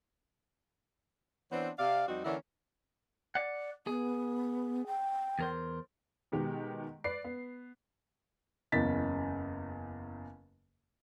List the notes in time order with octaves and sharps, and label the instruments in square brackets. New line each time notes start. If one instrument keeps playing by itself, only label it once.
[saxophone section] E3 B3 C4 D4 C5 C#5
C3 D5 F5
F2 G3 C4 D#4 F#4
D3 E3 A#3 C#4 D4 E4
[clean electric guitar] D5 F#5
[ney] B3 [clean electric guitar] G#4
[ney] G5
[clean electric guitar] E2 A#4 C5
[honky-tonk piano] B2 D#3 G#3 G4
B4 D5 C7
B3
[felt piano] F#1 E2 C#3 A6 B6